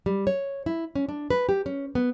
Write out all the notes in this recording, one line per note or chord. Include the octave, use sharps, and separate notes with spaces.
G3
C#5
E4
C#4
D4
B4
G4
C#4
B3